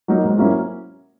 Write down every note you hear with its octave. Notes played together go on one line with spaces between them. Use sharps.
F#3 A#3 D#4
G#2
F#3 A#3 C#4 E4